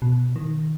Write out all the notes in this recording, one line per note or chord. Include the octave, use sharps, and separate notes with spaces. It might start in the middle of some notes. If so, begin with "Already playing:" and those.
B2
D#3